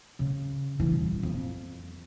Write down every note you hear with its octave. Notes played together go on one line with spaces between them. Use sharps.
C#3
E3
D#1
F2